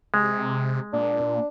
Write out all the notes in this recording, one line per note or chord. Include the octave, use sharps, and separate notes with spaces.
C3 G#3
A#2 D4